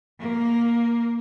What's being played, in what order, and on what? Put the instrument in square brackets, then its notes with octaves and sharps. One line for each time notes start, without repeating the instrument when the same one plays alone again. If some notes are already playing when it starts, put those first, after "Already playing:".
[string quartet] A#3